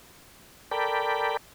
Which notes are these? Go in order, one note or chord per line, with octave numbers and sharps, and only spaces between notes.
A4 A#4 D5 G5 B5